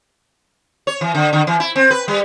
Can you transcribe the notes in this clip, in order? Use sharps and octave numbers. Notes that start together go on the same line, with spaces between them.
C#5
E3
D3
D3
E3
E4
C4
B4
G3